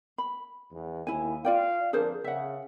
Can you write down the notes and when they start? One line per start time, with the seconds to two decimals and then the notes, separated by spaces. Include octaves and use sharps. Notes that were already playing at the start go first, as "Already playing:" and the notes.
0.18 B5
0.71 E2
1.07 D#2 E4 G#5
1.45 F4 D5 F5 G5
1.93 F2 D3 D4 G#4 A#4 C5
2.24 C#3 E5 F#5